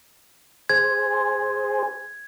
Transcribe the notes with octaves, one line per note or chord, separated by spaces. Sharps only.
G#4 C5 G#6